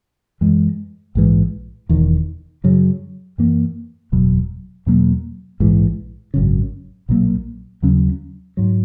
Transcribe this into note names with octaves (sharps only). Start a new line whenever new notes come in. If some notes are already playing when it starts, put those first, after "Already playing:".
F#2 E3 G#3
A#1 G#2 E3
E1 E2 D#3
F#2 C#3 F#3
F#2 E3 A#3
F#1 E2 B2 F#3
E2 B2 F#3 A#3
A#1 G#2 E3
G#1 F#2 C#3
B1 A#2 F#3 A#3
D#2 C#3 F#3 C#4
G#2 F#3